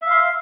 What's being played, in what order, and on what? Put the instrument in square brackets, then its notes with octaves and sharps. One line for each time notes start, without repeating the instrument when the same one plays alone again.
[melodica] E5
F5
C6